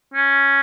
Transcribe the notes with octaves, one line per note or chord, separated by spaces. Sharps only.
C#4